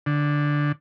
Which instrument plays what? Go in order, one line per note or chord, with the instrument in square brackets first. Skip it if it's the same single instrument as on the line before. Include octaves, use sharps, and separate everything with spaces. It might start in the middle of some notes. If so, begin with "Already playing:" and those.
[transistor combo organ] D3